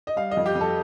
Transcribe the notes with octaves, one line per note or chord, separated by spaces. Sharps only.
D#5
G3 F5
D#5
F2
G4
F2
A4